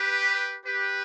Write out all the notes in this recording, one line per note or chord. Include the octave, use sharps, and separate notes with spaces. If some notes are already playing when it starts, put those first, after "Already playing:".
Already playing: G4 B4
G4 B4